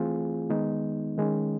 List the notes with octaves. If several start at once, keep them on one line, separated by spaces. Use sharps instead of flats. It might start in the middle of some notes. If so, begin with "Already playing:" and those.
Already playing: E3 A3 C4 F4 G#4
D#3 G#3 B3 D#4
D#3 G#3 C#4